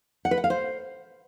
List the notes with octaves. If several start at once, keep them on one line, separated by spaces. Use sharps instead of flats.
F#5
B4
F#5
F5
C5